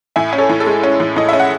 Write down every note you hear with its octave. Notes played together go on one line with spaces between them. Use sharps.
A2 E5 G#5
C#4
A4 C#5
A2
A4
G#3
C#4
A2
A2 D#5
C#4 E5
F#5